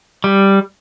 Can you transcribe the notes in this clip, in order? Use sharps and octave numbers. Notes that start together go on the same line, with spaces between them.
G3